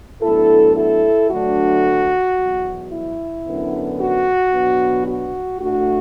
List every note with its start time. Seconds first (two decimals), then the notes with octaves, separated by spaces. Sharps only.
0.21 A2 F#3 B3 D4 E4 A4
0.76 E4 A4
1.29 D2 D3 F#3 A3 D4 F#4
2.37 E2 B2 F#3
2.91 E4
3.45 F#2 D3 B3 D4
3.99 F#4
4.53 B2 F#3 B3 D4
5.06 F#4
5.60 A2 A3 D4 F#4